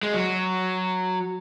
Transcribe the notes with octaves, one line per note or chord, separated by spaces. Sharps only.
G#3
F#3